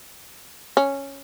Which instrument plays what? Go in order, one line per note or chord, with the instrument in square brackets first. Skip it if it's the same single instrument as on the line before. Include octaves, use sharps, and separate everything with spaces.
[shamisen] C#4